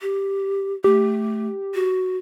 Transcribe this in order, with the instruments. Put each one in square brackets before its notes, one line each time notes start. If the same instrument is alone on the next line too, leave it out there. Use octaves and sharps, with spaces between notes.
[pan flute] G4
[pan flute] A3 [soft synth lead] G4
[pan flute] F#4